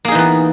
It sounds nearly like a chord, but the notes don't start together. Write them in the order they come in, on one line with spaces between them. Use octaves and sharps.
A#3 G#4 D#4 E3 B3